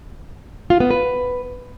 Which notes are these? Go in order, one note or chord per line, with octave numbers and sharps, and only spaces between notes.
F4
B3
B4